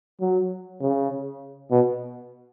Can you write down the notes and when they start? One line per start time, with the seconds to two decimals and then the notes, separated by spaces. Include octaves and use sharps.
0.21 F#3
0.82 C#3
1.71 B2